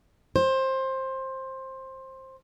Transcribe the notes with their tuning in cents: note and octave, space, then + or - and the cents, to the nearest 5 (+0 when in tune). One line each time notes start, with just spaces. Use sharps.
C5 +15